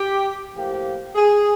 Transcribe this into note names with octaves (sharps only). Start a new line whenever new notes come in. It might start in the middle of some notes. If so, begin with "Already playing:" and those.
Already playing: G4
A2 F3 A#3 G4
G#4